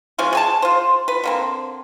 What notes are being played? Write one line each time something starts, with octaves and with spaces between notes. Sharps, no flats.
E3 F3 G#3 C#4
G#4 G#5 A5
F4 C5
B4
D3 A#3 C4